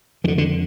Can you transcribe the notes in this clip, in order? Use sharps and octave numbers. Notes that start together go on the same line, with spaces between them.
F2 D3 D#3
D3